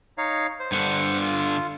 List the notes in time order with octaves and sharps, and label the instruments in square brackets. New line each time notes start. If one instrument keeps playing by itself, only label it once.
[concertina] D#4 C#5 F5
C5
[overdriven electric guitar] G2 D3 [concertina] C5 F#5
[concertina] F4